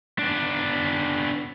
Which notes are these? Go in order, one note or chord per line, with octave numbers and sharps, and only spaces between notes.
B3 D4